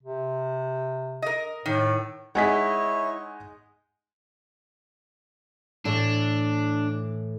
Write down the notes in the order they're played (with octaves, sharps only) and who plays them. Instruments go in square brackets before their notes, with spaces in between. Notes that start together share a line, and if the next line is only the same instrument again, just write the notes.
[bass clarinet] C3
[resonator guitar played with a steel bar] A#4 D#5
[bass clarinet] A2 [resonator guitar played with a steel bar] D#3
[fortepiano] G#3 D#4 [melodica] E4 C#5 [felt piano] F#5 G#5 B6
[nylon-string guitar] A2 E3 A3 [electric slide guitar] D4